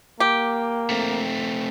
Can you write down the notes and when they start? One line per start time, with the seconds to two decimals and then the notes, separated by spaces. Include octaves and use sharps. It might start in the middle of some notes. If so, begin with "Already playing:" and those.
0.20 A#3 G4
0.90 A3 C4